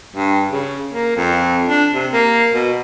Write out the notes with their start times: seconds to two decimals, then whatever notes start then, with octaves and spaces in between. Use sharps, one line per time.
0.16 G2
0.50 C#3
0.92 A#3
1.16 F2
1.67 D4
1.94 C3
2.13 A#3
2.54 B2